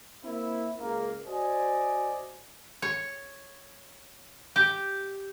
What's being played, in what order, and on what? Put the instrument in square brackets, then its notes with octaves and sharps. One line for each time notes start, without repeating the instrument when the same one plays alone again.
[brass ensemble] A#3 C4 E4
C#2 A#3
F#4 C5 D5 D#5 G#5
[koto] C#5
G4